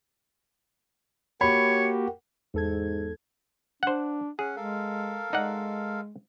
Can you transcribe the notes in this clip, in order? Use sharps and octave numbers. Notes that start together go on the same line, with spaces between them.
A#3 F#4 G4 C#5 B5 C#7
E2 G#2 A4 G#6
D4 C5 F#5
C#4 G#4 F#5
G#3 A4 A#4 F5
G#3 D#4 D5 F#5